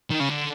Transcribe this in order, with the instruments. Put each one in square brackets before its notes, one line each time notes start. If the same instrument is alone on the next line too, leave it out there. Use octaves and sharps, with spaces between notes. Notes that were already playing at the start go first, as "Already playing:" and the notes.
[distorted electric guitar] D#3
C#3
D3